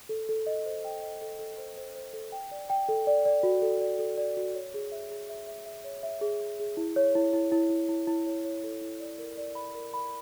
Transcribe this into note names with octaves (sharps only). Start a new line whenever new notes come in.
A4
A4
D#5
C5
G5
D#5
A4
A4
C5
C5
C5
A4
G5
D5
G5
A4
D5
D5
F#4
A4
D5
A4
D5
F#4
C#5
G#4
E5
G#4
E5
E5
E5
C#5
E5
G#4
G#4
G#4
E4
C#5
E4
E4
E4
E4
E4
E4
C#5
C#5
A4
E4
D5
A#4
D5
B5
A#4
B5